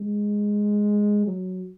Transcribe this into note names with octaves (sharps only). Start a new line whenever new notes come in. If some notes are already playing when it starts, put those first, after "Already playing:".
Already playing: G#3
F#3